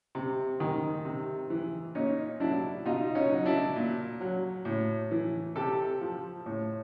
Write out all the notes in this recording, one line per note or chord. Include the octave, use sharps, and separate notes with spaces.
C3
D#3
C3
E3
A#2 C#4 D#4
F#3 D4 E4
B2 D#4 F4
C#4 D#4
F#3
D4 E4
A#2
F#3
A2
E3
C3 G4 A4
F3
A2